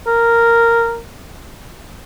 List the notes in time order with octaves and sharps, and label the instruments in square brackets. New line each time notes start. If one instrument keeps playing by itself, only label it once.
[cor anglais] A#4